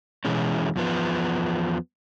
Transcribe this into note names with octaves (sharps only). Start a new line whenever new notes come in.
B2 E3 G#3 C#4
E2 F3 B3